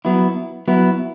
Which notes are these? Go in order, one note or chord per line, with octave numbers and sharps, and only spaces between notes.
F#3 B3 E4
F#3 B3 E4